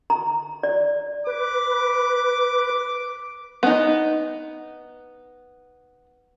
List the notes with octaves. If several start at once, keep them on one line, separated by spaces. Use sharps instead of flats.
A#5
D5
B4 D6
B3 D#4